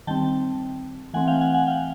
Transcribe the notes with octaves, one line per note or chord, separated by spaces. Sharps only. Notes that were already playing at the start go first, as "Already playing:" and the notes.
D#3 G3 C4 G5 A5
E3 A3 C4 F#5 G#5
F5 G5
F#5 G#5
F#5 G#5
F5 G5